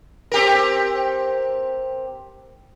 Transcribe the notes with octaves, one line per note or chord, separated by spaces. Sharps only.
C4 G4 A#4